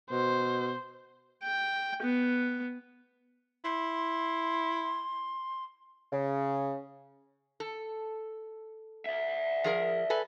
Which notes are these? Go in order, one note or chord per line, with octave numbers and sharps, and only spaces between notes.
B2 C5
G5
B3
E4 C6
C#3
A4
D5 E5
F3 G#4 A#4
A4 B4 G#5